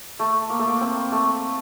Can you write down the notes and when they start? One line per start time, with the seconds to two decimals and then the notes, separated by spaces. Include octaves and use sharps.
0.20 A3
0.50 A#3
0.59 A3
0.68 A#3
0.81 C4
1.12 A3